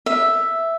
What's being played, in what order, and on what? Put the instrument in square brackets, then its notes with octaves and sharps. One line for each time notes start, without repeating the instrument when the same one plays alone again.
[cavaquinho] E5